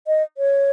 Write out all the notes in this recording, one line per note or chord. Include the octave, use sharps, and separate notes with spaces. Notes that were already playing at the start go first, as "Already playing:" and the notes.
D#5
C#5